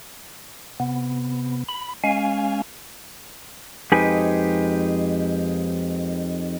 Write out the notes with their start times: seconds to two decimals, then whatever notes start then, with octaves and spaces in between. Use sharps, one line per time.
0.80 C3 B3
1.69 B5
2.04 G#3 C#4 F5 G#5
3.92 F2 G#3 D#4 G4 B4 G#5